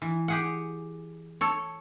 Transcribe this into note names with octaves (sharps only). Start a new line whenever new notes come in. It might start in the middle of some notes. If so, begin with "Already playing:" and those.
E3
G4 G#4 F#5
A4 C#5